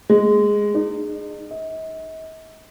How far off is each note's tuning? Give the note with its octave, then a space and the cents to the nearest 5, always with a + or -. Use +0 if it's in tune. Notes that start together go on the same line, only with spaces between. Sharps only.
G#3 -5
D#4 -45
D#5 +45